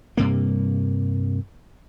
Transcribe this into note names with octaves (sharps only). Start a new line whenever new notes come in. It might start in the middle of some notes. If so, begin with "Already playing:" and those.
G2 C3 A#3